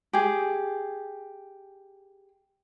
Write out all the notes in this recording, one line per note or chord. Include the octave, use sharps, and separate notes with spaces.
G4 G#4